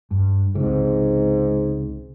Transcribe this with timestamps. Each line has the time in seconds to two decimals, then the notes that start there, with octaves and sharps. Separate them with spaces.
0.11 G2
0.55 C#2 G#2 C3